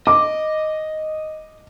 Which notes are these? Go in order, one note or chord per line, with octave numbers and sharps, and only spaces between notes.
D#5 D6